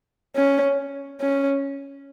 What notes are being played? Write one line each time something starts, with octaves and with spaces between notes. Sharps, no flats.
C#4
C#4